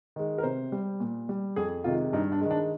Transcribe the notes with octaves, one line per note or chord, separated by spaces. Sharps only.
D#3 G#3
A#4
C3 C5
G3
A#2
G3
F2 G#4
C3 D#3 G#3 F4
G2 D#4
D4
D#3 G#3
D4